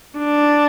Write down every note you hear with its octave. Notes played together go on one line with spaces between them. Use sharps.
D4